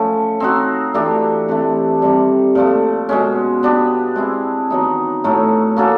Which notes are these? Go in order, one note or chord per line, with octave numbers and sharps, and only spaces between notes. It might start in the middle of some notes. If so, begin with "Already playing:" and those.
Already playing: F3 A3 C#4
C4 D#4 F#4
E3 A3 D4 G4
C3 E3 A3
C3 D#3 G3
A#2 F3 A3
B2 G#3 C#4
B3 D4 G4
G#3 C4 E4
D#3 F#3 B3 D#4
A2 F#3 A3
A#3 C#4 F#4 A4